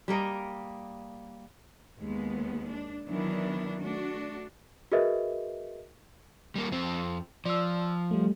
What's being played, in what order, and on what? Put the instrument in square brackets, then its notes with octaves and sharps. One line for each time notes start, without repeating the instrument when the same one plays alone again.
[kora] G3 A#3 A#4 D#5
[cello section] D#2 G#3 B3
D4
D#3 E3 F#3 B3 D4 E4
A3 D4 F#4
[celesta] F#4 G#4 A#4 B4 D#5 E5
[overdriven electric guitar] G3 A#3
F2 C4
[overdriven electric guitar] F3 [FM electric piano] D5 E6
[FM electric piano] G3 A3